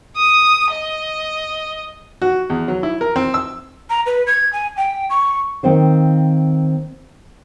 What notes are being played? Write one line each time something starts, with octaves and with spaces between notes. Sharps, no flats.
D#6
D#5
F#4
E2
F#3
E4
A#4
C4
E6
A#5
B4
G#6
G#5
G5
C#6
D#3 C4 C5 F5